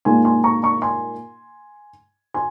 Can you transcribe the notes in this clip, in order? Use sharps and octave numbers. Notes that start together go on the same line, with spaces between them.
A#2 G#3 D#4 G#5 C6
G#5 C6
A#5 C#6
A#5 C#6
G#5 C6
G#5 C6